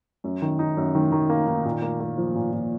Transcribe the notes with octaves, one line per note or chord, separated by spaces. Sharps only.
F#2
D#3
D#4
F#2
D#3
D#3
A#3
D#3
A#2
A#3
A#3
F3
A#2
A#2